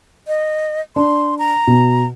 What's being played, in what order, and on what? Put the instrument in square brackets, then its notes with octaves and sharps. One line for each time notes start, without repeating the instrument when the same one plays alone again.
[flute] D#5
[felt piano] D4 [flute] C6
[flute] A#5
[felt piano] B2